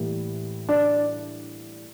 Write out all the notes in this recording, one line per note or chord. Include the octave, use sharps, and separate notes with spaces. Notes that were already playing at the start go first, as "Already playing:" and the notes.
Already playing: A2 E3 G3 A#3
D4